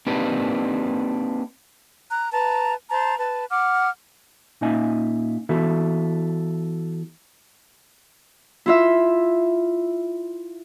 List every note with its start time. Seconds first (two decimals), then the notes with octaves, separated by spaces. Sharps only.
0.07 A#3 C4 D4 D#4 G4 B4
2.11 A#5 F#6
2.31 B4 A5 A#5
2.89 C5 A5 A#5
3.19 B4 A5
3.50 F#5 D6 F6
4.61 A#2 C#4 D#4 D#5 E5 G#5
5.49 E3 B3 E4 F#4 A4 E5
8.66 E4 F4 E5